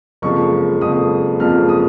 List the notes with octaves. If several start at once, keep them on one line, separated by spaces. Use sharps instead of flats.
F#1 F2 F3 G#3 C#6
F#1 F2 F3 G#3 D#6
F#1 F2 F3 G#3 F6
D#6